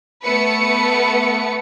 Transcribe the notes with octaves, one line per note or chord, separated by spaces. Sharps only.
A3 B3 B4 C#7